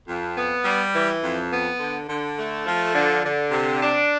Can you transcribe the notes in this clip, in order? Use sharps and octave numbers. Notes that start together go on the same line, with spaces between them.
F2
B3
G3
E3
F2
B3
D3
D3
A3
F3
D3
D3
C3
D4